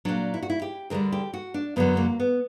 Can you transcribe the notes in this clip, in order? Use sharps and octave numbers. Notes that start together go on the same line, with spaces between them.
A#2 F#3 D4
E4
F#4
E4
G4
D2 D3 G3 A#4
G4
F#4
D4
F#2 D3 F#3 B3
A#3
B3